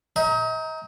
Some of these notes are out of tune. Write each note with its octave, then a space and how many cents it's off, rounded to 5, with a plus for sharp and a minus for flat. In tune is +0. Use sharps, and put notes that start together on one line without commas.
D#5 +40 G5 +0 A#5 +0